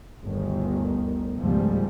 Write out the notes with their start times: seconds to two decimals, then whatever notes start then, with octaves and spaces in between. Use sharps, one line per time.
0.24 G1 D2 D#3
1.37 C#2 G#2 B2 F3 G3 A3